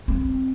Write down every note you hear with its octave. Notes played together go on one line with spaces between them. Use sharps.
C4